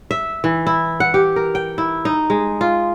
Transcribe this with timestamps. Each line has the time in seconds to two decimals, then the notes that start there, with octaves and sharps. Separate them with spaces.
0.11 E5
0.44 E3
0.67 E4
1.00 F#5
1.14 G4
1.36 A#4
1.55 G5
1.78 E4
2.05 D#4
2.30 G#3
2.61 F4